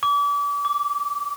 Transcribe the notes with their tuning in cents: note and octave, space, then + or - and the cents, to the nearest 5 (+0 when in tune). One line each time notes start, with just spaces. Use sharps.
D6 -35
D6 -5